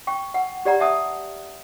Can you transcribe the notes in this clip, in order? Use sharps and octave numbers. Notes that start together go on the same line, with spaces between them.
G5 C#6
F#5
G4 D5 F#5 A#5
E5 F#5 A5 D#6